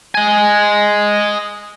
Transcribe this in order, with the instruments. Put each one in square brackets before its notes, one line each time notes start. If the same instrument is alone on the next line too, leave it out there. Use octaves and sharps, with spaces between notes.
[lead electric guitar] D#5 G#5